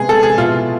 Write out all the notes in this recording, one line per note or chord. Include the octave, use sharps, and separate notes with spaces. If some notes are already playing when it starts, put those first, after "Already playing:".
Already playing: C3 G#3 B3 G#4
A4
G#4
B2 B3 E4 F4